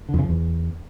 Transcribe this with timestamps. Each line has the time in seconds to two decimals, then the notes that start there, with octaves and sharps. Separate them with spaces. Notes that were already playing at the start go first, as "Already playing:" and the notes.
0.09 D3
0.14 F2
0.19 C#3
0.24 F3
0.29 E2